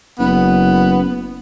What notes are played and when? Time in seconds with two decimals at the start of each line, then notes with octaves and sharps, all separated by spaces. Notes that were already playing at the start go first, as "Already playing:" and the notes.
0.19 F#1 B3